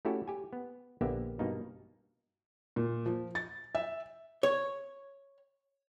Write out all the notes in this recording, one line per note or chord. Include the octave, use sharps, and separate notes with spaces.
A3 C#4 E4 F#4 G4 A4
G4 G#5
B3
A#1 D3 A#3 B3 G4 E5
G2 B2 A#3 D#4
A#2
F3
A6
E5
C#5